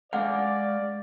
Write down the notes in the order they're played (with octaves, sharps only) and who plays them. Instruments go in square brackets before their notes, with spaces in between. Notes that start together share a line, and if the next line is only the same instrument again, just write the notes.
[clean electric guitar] G#3 F5 [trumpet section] D5 [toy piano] F#5